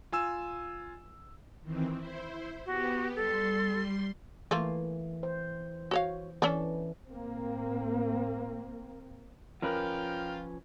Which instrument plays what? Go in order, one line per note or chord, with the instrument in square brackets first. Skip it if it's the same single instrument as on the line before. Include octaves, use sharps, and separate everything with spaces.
[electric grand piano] F4 G#5 E6 E7
[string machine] D#3 E3 C4
E4 C5
[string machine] B3 G4 [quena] F#4
[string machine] G3 C6 [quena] A4
[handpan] E3 [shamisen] A3 A#3 F4
[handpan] C5
[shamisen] F#4 C#5 F5
[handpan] E3 [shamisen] C#4 D4 A4
[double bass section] A2 A#3 C4
[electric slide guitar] F3 C#4 B4 [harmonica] F4 F5 G5 [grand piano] A#4